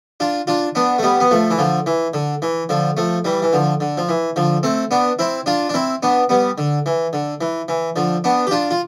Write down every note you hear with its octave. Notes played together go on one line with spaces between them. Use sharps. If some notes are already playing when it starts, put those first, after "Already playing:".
D4 F4
D4 F4
B3 D4
A3
G3 B3
B3
F3 A3
E3
D3 F3
E3
D3
E3
D3 F3
F3 A3
E3 G3
E3
D3 F3
D3
F3
E3
D3 F3
A3 C4
B3 D4
C4 E4
D4 F4
D4
C4 E4
B3 D4
G3 B3
D3
E3
D3
E3
E3
D3 F3
B3 D4
G4
D4 F4
F4